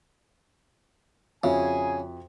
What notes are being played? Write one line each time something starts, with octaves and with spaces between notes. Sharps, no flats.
F2 C#3 F#4 G#4 E5 G#5